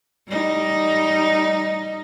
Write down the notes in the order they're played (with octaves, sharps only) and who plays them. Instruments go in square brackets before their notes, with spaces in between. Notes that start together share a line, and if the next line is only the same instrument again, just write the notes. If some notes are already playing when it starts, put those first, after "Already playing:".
[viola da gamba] G3 D#4